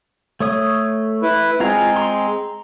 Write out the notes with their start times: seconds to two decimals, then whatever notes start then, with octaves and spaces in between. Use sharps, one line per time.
0.40 A3 C#5 D#6
1.23 E4 B4
1.60 G#3 C4 F4 G#4 A#5
1.96 A#5 C6